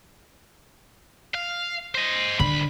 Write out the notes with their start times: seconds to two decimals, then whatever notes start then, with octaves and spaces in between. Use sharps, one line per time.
1.35 F5
1.95 C5 D#5
2.39 C2 D3 B5